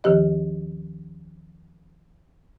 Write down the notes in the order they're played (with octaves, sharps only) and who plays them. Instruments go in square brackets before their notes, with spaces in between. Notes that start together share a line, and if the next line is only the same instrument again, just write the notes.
[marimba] D#2 D#3 F3 G4 D#5